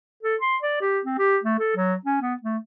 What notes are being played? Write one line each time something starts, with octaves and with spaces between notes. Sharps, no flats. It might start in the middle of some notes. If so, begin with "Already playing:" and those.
A4
C6
D5
G4
C4
G4
A3
A4
F#3
C#4
B3
A3